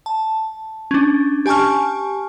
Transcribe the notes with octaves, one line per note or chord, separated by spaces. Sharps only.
A5
C#4 D4
G4 G#5 A5 C#6 F6